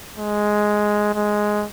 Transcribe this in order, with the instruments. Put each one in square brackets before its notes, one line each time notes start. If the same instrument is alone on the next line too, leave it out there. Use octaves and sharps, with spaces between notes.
[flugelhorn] G#3
G#3